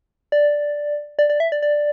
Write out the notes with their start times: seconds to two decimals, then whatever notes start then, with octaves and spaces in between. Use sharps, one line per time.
0.32 D5
1.19 D5
1.30 D5
1.40 E5
1.52 D5
1.62 D5